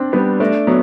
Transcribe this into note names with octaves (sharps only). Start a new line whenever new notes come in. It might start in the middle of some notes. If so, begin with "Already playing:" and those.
Already playing: C4 D4
G3 B3
A3 D4
F#3 B3